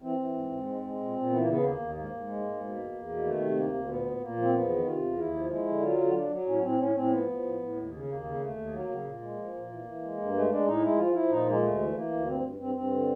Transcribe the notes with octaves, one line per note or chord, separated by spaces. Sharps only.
E3 C4
E3
G#2
G#2
G#3
G#3
A#2
A#2
E3 B3
A#3
C#3 B3
D#2 A#3
D#2
G#2 A#3
G#2
G#3
G#2
B2
E2
E2
B2
D#3 A3
C3
D2 A#3
D2
A#2 B3
A#2
A#2 A#3
F3
C4
E2 B3
D#3
C3 F4
E2
D#2 E4
F3
G#3 E4
D3
F#3 F4
D3 F4
F#3 D4
F#3
A2 C#4
A2 C4
A2 C#4
A2 C4
F3 B3
F3
A2
A2
D#2
C#3
D#2 A#3
C#3
D#2 A3
D#2
F#3 A#3
C#3
A#2
G#3
F3
A#2
E3
E3
G#3
G2
G#3 A3
G#3 D4
A2 D#4
G#3 E4
F3 F4
F3 E4
A#2 D#4
G#3 A#3
D2 A3
E3
E3 A#3
D2
G2 C4
G2
G2 C4
G2 C4
D3